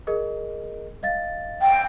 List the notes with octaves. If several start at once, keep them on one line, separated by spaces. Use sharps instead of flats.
G#4 A#4 D#5
D#5 F5 A6
G5